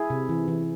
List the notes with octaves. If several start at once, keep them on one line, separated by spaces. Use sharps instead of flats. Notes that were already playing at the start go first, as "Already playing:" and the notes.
Already playing: E4 G#4
C3
E3
E3